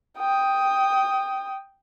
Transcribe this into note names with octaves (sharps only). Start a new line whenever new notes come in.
G5 D#6